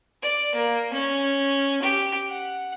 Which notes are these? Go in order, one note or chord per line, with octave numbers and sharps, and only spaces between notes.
D5
A#3
C#4
G4
F#5